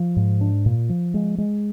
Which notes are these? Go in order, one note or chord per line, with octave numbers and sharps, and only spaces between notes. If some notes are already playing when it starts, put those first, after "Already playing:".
Already playing: F3
G#2
D4
A#2
F3
G#3
G#3